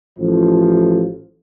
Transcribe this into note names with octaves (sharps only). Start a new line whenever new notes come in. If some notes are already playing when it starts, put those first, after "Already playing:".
A1 F3